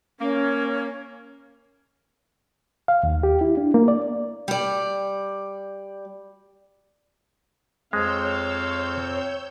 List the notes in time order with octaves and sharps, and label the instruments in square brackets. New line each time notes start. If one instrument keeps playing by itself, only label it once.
[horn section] A#3 [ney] C#4
[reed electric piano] F5
D#2
G4
E4
D4
A#3
D5
[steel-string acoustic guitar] G3 D5
[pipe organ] F2 C4 [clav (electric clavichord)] G#3 [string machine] C#5 E6 G6 [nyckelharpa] F5